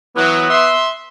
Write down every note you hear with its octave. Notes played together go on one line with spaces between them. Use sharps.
E3 F#3 B3
E5 C6